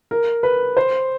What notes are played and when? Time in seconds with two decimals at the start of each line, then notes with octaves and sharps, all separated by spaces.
0.11 A#4
0.43 B4
0.77 C5